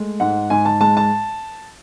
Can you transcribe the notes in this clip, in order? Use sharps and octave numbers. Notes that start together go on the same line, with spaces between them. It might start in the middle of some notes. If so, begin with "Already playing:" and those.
Already playing: G#3 A3
G#2 F#5
G#2 G#5
A5
G#3 A5
A5